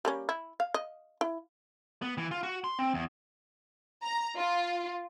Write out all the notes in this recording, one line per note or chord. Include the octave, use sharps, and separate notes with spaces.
G3 A#3 C#4
E4
F5
D#5
E4
B3
E3
F4
F#4
C6
C4
E2
A#5
F4